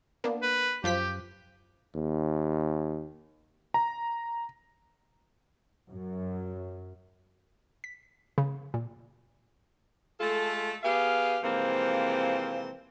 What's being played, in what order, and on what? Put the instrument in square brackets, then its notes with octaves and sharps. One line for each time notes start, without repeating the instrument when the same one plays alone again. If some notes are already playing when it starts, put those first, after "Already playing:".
[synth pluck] A#3 B3 D4
[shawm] B4
[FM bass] F#2 [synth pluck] F3 F4 B6 [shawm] G4
[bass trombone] D#2
[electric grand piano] A#5
[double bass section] F#2
[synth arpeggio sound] B6
C#3
A#2
[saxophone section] G#3 A3 F4 A4
B3 G4 G#4 F5
C3 E3 F3 G#3 A#3 C4